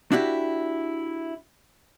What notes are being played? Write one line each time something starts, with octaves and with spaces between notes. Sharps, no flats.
D4 E4 F#4 G4